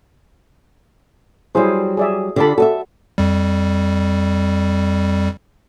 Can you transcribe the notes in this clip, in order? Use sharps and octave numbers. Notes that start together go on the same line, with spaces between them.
F#3 G3 E4 G#4 C5
G#4 D5 E5
D3 F4 G4 A4 D5 B5
F#4 A4 D#5 E5
F2 G3